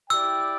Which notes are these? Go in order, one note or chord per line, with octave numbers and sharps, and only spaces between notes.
E4 G4 D5 G5 E6